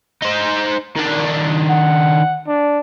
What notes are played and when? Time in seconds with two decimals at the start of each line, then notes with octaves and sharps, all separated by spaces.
0.22 D#4 C5
0.96 D#3 D4
1.70 F#5
2.47 D4